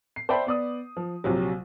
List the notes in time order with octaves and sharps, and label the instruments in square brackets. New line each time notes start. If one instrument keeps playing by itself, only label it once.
[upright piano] C7
C5 D5 E5 G5 A5 B5
B3 D5 D#6
F3
A#1 C3 F#3